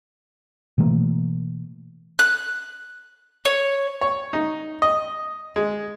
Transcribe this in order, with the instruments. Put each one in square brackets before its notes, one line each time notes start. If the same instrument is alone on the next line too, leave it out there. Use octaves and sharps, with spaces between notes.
[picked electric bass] B2 E3 A3 A#3
[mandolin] F#6
C#5
[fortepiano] C#5
D#4
D#5
G#3